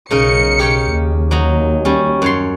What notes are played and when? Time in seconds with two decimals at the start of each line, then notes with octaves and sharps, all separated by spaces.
0.11 B1 C#3 D#4 A#4 C#7
0.59 G4 C#5 G5
0.91 D#2
1.31 F#3 D#4 A#5
1.85 G3 C#4
2.22 F#2 C#5 C6